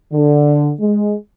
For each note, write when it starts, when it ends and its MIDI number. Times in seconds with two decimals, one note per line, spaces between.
0.12 0.71 50
0.80 1.14 56